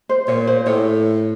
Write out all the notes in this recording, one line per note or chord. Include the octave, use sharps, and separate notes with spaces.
C5
A#2 C#5
C5
A2 C#5